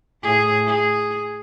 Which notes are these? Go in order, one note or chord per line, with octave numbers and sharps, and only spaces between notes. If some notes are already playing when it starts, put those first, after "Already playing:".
A2 G#4
G#4